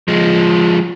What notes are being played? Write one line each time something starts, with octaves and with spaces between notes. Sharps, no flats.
F3 G#3